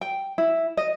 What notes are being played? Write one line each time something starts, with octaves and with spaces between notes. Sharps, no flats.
G5
E4
D#5